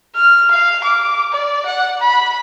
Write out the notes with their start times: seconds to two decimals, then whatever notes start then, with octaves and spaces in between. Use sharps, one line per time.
0.15 F6
0.51 F5
0.84 D6
1.32 D5
1.65 F#5
2.01 B5